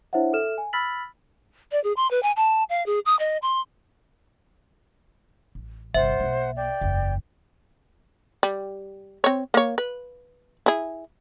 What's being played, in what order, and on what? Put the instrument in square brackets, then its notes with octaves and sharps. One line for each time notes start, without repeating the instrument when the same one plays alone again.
[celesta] D4 E4 C5 C#5 E5 F#5
A4 E5 F6 E7
G#5
B5 E6 F6 A6 B6 F#7
[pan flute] D5
G#4
C6
B4
G#5
A5
F5
G#4
D#6
D#5
C6
[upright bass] A1
[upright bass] G1 C2 [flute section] C5 F#5 [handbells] E5
[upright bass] B1 A#3
[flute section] D5 G5
[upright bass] F#1 E2
[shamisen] G3
C4 C#5
A#3 C#5
B4
E4 G#4